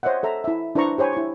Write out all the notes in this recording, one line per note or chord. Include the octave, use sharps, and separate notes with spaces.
C5 C#5 D#5 E5 F#5
A4 E5 A#5
E4 E5
D4 E4 B4 C5 A#5 C#6
G4 C5 C#5 G#5 B5
E4 C#6